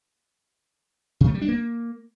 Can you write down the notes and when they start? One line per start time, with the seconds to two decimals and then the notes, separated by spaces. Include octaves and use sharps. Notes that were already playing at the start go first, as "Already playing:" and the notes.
1.21 C3
1.28 A3
1.34 G3
1.41 D4
1.48 A#3